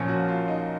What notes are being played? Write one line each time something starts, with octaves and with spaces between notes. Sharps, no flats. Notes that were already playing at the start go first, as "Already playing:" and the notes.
Already playing: A#1 A#2 F3 A#3 C#4
F#4
F4
D#4